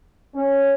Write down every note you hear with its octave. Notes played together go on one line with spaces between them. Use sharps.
C#4